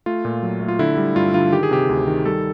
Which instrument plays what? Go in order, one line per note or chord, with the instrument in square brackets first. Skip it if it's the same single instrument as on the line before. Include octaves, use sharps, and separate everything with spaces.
[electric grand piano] A3 F4
A#2
F#3
A3
F4
D3 E4
G3
G2 F4
D3 F4
D#3 G4
G#4
C3 G4
D2
D#3
G3 A4